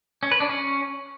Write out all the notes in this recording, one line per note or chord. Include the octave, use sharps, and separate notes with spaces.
C#4
B4
D4
C#4